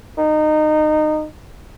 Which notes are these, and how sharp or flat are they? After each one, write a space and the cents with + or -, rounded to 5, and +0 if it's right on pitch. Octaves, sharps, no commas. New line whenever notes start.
D#4 -20